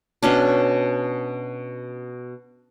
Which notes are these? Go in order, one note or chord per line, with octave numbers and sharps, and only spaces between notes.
B2 C#4 D4